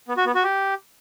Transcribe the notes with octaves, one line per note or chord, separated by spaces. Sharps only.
B3
F#4
B3
F#4
G4